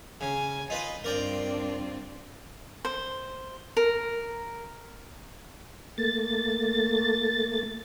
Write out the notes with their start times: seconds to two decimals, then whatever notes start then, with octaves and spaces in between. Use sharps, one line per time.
0.21 C#3 G#5
0.70 D#4 F4 B4 D#5
1.04 G2 C4 D4 F4 A#4 D5 G5
2.85 C5
3.77 A#4
5.98 A3 A#3 A6